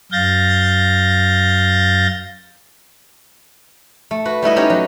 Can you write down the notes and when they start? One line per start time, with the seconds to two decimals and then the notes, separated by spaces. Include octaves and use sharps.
0.12 F#2 F5 G6 A6 A#6
4.11 A3
4.25 F#4 B4
4.42 G3 A3 E4 D#5
4.56 C#4 D#4 G4 C#5 D#5
4.70 F#3